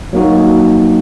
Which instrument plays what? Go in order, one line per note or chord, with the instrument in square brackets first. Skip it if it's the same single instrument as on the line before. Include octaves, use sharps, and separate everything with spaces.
[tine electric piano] F#3 A#3 D#4 F#4